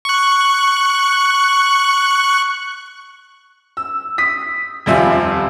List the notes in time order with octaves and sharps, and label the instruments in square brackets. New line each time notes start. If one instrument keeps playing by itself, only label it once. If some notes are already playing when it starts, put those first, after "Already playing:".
[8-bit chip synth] C#6 F#6
[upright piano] E6
D#6 B6
D#1 F2 G3 F4 E5 G#5